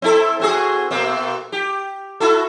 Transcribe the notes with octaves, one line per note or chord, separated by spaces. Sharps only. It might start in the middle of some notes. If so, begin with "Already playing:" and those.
C4 E4 A4
C4 F#4 G#4
B2 A#3 C4
G4
E4 F#4 A4